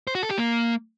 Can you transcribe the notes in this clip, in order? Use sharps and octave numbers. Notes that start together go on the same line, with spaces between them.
C5
F#4
A4
G4
A#3